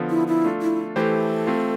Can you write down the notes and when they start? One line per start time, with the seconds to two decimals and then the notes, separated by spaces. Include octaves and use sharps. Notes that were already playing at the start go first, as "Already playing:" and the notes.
Already playing: D3 F3 B3 F4 A4
0.10 E4
0.27 E4
0.44 A3 D4 F4 A4
0.62 E4
0.96 E3 A3 E4 G4 A4 B4 C5
1.47 A3 C4 F4